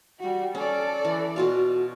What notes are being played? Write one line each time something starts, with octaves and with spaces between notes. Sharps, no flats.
G3 F#4
C#4 A4 D5
E3
B2 F4 F#4 F5